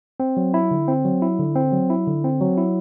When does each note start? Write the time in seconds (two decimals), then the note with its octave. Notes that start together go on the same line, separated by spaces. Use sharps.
0.20 C4
0.37 F#3
0.54 E4
0.71 D3
0.88 C4
1.05 F#3
1.22 E4
1.39 D3
1.56 C4
1.72 F#3
1.90 E4
2.07 D3
2.24 C4
2.41 F#3
2.57 E4